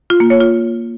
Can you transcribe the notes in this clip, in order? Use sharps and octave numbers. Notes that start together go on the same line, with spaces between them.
F4
A#3
C#5
F4